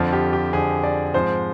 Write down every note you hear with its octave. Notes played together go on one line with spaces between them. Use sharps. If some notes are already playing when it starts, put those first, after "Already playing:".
Already playing: F2 D3 F3
G4
G4
F2 D3 F3 G#4
D5
G#2 F3 G#3 C4 C5